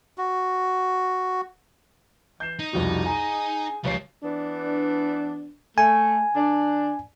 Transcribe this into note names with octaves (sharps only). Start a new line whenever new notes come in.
F#4
E3 G6 C7 E7
D#4
C2 F2 B2 G3
G#4 A#5 D#7
C#2 F3 G3 C#5 C7
E3 B3 D4
A3 G#5
D3 D4